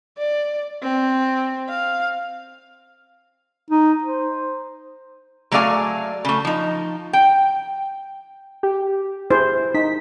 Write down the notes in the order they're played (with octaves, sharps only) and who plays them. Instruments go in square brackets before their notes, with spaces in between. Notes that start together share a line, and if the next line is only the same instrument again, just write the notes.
[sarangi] D5
C4
F5
[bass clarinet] D#4
C5
[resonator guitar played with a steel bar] F#3 A3 G#4 D5 F5 G#5
C#3 A3
F3 D#4
G5
[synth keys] G4
[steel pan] E4 G#4 C5
[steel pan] D#4 [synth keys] B6